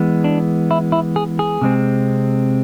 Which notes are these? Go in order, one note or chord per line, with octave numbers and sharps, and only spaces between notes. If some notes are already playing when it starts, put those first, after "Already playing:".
Already playing: E3 G#3 B3
D4
E4
E4
G#4
G#4
C3 G#3 C4